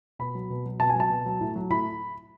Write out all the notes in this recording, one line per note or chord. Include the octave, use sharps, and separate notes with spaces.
B2 B5
F#3
B2
F#3
B2 A5
G#5
F#3 A5
B2
F#3
A2
F#3
A2 B5